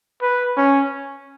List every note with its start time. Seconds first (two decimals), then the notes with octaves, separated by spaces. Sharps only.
0.22 B4
0.57 C#4